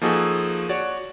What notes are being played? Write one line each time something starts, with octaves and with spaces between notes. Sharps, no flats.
F3 A#3 D#4 F#4 G#4 A4
F#4 C#5 D5